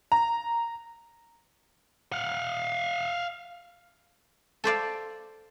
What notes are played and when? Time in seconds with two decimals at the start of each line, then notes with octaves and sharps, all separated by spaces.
0.12 A#5
2.12 F5 F#5
4.64 A4 C5 D5 F5